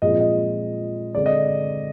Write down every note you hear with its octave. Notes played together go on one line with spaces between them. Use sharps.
A#2 F3 G#3 C4 D#5
D#5
D3 G#3 C4 D5
D#5